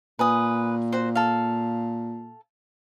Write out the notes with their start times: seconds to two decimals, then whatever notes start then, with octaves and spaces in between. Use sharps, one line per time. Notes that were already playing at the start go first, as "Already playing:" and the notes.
0.19 A#2 B4 G#5 D#6
0.92 F#4 C5
1.15 A4 F5